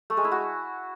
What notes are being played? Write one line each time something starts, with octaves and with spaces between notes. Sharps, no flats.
A3
G#3
E4
F#4